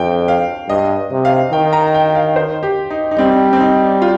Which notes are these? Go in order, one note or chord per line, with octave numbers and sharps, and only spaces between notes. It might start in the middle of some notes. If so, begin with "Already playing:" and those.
Already playing: F2 G5
F5
G2 D#5
C3
F5
D#3 G5
A#5
G5
F5
C5
G4
D#4
D#4
G3 C4
C4
D#4
F4